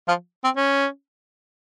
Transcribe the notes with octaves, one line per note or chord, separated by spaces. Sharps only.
F3 F4
C4
C#4